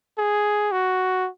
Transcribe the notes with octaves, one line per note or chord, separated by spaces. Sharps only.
G#4
F#4